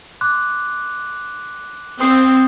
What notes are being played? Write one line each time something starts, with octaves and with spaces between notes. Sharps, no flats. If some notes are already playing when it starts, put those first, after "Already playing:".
C6 D6 F#6
C4 C6 D#6 C7